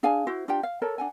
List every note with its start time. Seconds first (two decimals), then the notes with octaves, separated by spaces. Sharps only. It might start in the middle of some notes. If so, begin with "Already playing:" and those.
0.03 D4 G#4 F5 G#5
0.27 E4 F#4 C5
0.48 D4 F4 G4 G5
0.63 F5
0.82 A4 A#4 C#5 A#5
0.98 D4 F#5 G#5